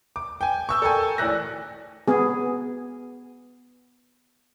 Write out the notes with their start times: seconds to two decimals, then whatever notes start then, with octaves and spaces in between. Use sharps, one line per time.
0.16 D6
0.41 G5 G#5
0.69 C#6 E6 G6
0.82 A4 A#4 G5 G#5
1.18 A1 D2 D5 F#6 A#6
2.08 B3 G#4